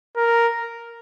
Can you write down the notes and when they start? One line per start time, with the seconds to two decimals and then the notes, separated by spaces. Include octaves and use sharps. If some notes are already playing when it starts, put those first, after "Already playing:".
0.17 A#4